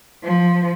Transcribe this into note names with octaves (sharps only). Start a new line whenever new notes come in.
F3